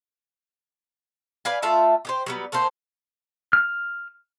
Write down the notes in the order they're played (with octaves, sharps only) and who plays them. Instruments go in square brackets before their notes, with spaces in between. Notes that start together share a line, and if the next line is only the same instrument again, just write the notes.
[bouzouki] B4 D5 F5 G#5
A3 F4 E5 A5
G4 G#4 C5
F#3 G3 B3
A3 A#3 A4 C5
[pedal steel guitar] F6